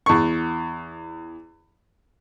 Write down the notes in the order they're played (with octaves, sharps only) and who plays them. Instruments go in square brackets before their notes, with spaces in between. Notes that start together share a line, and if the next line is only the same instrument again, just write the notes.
[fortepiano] E2 C#6